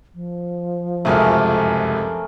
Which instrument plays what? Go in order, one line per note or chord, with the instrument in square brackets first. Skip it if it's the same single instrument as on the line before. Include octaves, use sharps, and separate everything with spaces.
[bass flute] F3
[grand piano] F1 C#2 F#2 [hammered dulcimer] A3 G#4 A#4